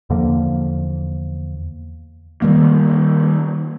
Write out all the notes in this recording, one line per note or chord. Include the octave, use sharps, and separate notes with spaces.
E2 D3 F3 A#3
D#3 G3 A#3